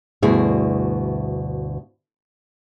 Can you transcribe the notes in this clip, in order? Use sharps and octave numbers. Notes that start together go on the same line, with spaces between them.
D2 G2 B2 E4 G#4